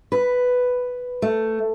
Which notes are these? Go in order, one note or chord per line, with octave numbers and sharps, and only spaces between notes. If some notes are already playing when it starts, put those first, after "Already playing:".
B4
A3